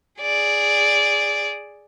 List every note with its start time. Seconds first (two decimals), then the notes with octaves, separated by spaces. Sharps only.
0.21 G#4 D5